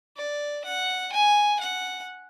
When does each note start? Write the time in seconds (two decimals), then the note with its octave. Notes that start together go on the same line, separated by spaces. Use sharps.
0.17 D5
0.65 F#5
1.13 G#5
1.60 F#5